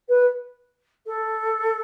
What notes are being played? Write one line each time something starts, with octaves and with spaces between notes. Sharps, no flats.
B4
A4